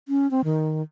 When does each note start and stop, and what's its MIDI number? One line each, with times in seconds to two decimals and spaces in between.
0.08 0.29 61
0.31 0.41 60
0.44 0.82 51